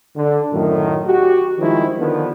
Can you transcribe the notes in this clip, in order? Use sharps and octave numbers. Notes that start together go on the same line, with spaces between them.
D3
F#2 A2 D#3
F#4 G4
D#3 F3 G3 G#3 D4 E4
D3 D#3 F3 B3